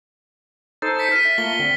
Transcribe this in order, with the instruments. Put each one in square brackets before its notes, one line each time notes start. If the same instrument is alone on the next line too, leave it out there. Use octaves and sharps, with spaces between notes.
[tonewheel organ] D#4 A4 C5 [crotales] A6
[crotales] A6 B6 C#7
F6 B6 D#7
[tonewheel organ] E5
[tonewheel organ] A3 A#3 F4 [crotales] G7
[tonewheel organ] D3 C4